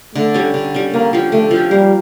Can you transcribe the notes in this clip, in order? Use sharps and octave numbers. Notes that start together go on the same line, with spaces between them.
D3 A3
G3 C#4
D3
G3 C#4
D3 A#3
F3 C#4 G4
D3 A3
F3 C#4 G4
G3 A#3